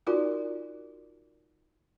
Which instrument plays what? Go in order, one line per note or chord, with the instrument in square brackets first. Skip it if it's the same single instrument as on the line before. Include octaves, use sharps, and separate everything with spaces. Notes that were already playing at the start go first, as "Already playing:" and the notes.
[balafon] D#4 F4 F#4 A#4 D5